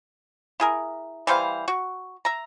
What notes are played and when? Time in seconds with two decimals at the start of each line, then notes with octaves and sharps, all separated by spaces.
0.60 E4 G#4 A#4
1.27 E3 G3 C5 F5
1.68 F#4
2.25 E5 A#5